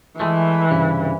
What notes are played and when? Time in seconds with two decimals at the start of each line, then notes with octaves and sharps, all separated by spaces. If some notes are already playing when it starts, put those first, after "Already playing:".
0.20 E3 G#3 A3
0.70 C2 G2 C#3